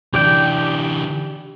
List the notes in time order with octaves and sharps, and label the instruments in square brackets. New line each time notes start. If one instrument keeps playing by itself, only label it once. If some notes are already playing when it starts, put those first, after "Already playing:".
[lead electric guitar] D3 E3 [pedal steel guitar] G4 D5 G5